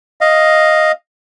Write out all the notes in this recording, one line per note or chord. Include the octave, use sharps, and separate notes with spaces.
D#5 F5